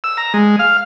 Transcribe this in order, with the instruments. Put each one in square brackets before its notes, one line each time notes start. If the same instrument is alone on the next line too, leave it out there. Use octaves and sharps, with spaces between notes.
[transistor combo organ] E6
A#5
G#3
F5